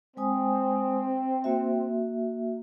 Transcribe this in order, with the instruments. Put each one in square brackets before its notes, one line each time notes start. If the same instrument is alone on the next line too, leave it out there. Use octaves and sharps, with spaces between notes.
[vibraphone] G#3 G#5 D#6 [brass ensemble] C4
[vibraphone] A#3 F#4 E5